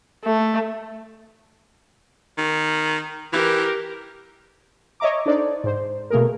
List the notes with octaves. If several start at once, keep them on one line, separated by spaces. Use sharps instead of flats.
A3
D#3
E3 G4 A#4
C#5 D#5 E5 A#5 D6
D4 D#4 A4 C5 D5
G#2 C5
B2 A3 A#3 G#4 A#4